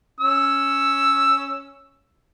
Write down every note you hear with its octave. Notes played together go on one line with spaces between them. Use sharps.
C#4 E6